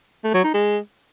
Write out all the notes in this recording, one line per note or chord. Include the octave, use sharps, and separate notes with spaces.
A3
F#3
D#4
G#3